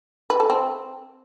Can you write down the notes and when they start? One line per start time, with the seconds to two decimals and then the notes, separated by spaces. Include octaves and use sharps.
0.30 B4
0.40 A4
0.50 C4